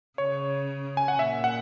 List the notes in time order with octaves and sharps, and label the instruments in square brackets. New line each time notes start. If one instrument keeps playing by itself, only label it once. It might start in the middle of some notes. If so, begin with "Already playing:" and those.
[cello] C#3 [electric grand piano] C#5
[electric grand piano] G#5
F#5
[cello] A#2 [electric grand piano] E5
[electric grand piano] F#5